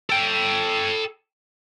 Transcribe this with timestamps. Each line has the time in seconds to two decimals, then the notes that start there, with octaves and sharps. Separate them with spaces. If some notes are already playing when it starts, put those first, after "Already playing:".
0.10 A4 G5